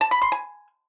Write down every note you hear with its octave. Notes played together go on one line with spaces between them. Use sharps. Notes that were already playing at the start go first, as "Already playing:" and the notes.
A5
B5
C6
G#5